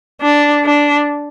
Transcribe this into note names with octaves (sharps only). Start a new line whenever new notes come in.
D4
D4